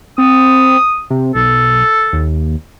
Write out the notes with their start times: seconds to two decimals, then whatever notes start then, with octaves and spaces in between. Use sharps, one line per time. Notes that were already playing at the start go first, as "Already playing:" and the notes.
0.18 C4 D#6
1.10 C3
1.35 B1 A4
2.13 D#2